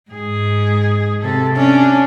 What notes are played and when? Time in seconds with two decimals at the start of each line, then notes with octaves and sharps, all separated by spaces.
0.11 G#2 G#4
1.22 C3 A4
1.56 C#4 D4